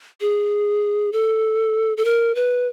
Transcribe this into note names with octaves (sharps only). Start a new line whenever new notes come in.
G#4
A4
A4
A#4
B4